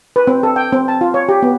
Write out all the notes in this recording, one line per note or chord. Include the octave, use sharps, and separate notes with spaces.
B4
C4
A4
G5
C4
A5
F4
C#5
G4
B3